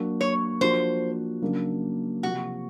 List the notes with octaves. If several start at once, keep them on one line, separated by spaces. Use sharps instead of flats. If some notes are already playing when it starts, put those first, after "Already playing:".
Already playing: F#3 A#3 D4 F#4
C#5
F3 A#3 D4 F#4 C5
C#3 F#3 A#3 D4
C3 F3 A#3 F#4